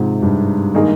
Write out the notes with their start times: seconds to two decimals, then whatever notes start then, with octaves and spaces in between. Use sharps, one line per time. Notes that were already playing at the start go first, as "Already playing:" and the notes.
Already playing: G#2 C3 F3 C4
0.22 G2
0.74 D#3 A#3 D#4 G#4